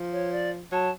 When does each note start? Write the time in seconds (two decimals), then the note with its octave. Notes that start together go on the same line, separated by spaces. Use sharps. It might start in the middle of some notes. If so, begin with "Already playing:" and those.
Already playing: F3
0.11 C#5
0.32 D5
0.72 F#3 A5